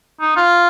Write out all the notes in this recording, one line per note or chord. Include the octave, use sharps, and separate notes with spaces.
D#4
F4